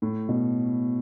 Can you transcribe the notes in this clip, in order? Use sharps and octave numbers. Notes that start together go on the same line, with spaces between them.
A2
B2